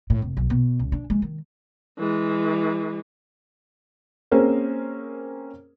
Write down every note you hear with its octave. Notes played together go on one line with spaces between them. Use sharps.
A2
F1
B1
B2
C#2
D4
G#3
D#3
E3 G#3
A#3 C4 C#4 G#4 A#4 C5